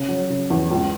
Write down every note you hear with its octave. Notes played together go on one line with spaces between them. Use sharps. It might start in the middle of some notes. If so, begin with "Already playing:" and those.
Already playing: C#3
F#3
C#3
E2
C#2